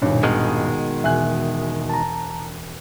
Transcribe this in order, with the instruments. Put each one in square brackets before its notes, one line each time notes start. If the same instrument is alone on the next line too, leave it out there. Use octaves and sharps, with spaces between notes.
[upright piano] D#1 G2 [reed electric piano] B2 D#4 C#5
[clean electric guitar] B2 D#3 G#3 [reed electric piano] F6
[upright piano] E1 G#5 F#6 [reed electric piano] E5
[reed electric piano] A5 A#5